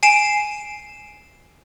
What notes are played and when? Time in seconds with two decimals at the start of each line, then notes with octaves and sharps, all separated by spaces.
0.03 G#5 C7 D7 E7